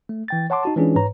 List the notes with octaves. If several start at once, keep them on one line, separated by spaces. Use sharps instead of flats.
A3
E3 G5 A6
C#5 F#5 A5 C6 D6
D#4 F#4 A5
E3 G#3 C#4 D4 F4 G#4
G#2 B4 C#5 A#5